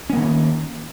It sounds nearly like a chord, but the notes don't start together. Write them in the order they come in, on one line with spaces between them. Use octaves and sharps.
C#4 A#3 D#3